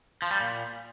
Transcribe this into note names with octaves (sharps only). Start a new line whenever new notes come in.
F3
G3
A#2